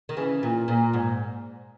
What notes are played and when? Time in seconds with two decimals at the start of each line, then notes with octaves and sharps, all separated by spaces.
0.09 D#3
0.17 C#3 E3
0.43 A#2
0.68 A#2
0.93 G#2